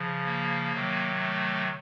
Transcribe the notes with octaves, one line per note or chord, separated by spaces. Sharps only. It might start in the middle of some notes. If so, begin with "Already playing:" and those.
Already playing: C#3 F3
A#3
C3 D#3 F#3
A3